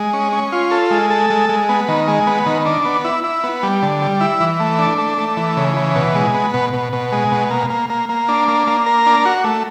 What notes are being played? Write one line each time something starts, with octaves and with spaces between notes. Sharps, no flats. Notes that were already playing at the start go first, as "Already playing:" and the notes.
Already playing: G#3
C#4
C#4
F4
A4
G#3
A4
G#3
G#3
B3
D#3
G#3
B3
D#3
D4
B3
E4
E4
B3
G3
D3
G3
E4
E3
A3
D4
A3
A3
E3
C#3
E3
B2
G#3
B3
B2
B2
B2
G#3
B2
A#3
A#3
A#3
A#3
D4
A#3
A#3
A#4
D4
F#4
A3